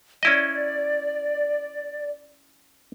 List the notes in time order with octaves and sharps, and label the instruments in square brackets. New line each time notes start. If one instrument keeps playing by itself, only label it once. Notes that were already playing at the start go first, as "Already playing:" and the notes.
[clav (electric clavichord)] C#4 E4 D#5 [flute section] D5